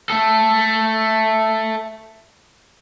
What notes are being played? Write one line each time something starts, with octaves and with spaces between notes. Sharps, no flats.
A3 A4